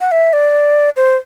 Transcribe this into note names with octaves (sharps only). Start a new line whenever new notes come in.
F#5
E5
D5
C5